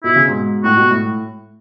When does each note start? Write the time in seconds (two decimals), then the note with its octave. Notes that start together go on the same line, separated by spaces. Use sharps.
0.04 B2 E4
0.16 C#3
0.28 G#2 B2
0.64 A2 F#4
0.77 B2
0.91 A2